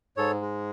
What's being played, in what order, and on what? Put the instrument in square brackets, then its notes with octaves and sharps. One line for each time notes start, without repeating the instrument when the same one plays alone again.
[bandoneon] G#2 A4 C#5
G#3